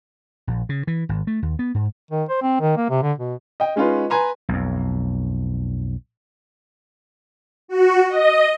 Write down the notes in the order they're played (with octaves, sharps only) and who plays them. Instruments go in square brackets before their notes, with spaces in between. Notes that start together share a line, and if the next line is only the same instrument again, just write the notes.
[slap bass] A#1
C#3
E3
G#1
A3
D#2
B3
G#2
[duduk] D#3
C5
C4
D#3
A#3
C3
D3
B2
[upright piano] D#5 G5
G#3 C#4 D#4 F4 B4
B4 G#5 A#5 C6
[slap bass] B1 F2
[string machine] F#4
D#5